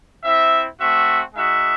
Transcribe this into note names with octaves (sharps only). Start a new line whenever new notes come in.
C4 E4 E5
A3 C4 F#4 E5
G#3 D#4 F#4 E5